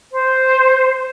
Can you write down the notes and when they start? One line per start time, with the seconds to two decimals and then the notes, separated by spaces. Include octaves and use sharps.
0.11 C5